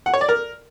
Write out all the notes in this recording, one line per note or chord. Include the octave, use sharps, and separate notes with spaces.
F#5
C#5
D5
A#4